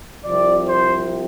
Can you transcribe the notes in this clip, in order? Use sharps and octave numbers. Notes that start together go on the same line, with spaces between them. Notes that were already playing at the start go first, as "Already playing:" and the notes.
C2 C3 F3 D5
C5